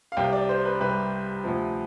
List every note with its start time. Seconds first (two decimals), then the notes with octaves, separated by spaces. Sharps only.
0.12 F5
0.17 C2 C3 G3 G5
0.32 D5
0.49 C5
0.65 B4
0.80 C2 C3 G3 B4
1.44 D2 C3 F3